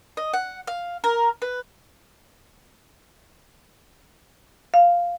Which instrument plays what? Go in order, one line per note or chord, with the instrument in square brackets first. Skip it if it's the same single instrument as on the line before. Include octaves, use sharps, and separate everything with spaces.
[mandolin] D#5
F#5
F5
A#4
B4
[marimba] F5